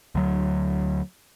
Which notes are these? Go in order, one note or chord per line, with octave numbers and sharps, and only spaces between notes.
D2 F#3